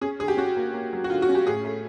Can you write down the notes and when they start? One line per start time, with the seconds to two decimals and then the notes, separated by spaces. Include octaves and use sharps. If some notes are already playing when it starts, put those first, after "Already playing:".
0.01 C#4 G#4
0.19 D3 G#4
0.28 G4
0.37 C#4 F#4
0.56 A#3
0.74 A#3
0.93 F#3
1.04 F#4
1.10 D3 F4
1.22 F#4
1.29 C#4
1.35 G4
1.47 A2 G#4
1.65 A3